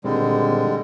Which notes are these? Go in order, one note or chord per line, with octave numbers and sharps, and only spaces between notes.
A#2 D3 D#3 G3 G#3 C4